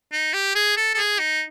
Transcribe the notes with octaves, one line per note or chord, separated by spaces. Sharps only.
D#4
G4
G#4
A4
A4
G#4
D#4